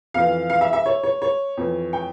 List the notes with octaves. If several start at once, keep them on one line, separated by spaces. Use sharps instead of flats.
F2 E3 F5
F5
E5
E5
C#5
C#5
C#5
F2 E3
G5